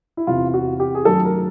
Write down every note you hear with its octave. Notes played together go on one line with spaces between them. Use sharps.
E4
E2 C3 E3 F4
F#4
G4
G#4
F#2 D#3 F#3 A3 A4
A#4